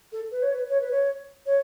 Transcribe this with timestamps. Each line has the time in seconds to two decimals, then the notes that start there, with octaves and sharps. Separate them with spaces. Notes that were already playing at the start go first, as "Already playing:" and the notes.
0.12 A4
0.31 B4
0.42 C#5
0.53 B4
0.70 C#5
0.80 B4
0.91 C#5
1.46 C#5